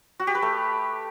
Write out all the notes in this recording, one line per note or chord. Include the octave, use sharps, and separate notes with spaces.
F#4
G4
B4
A3